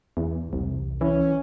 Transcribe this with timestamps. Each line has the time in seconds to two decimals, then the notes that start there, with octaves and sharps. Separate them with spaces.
0.17 E2
0.53 C2
1.01 E3 C#4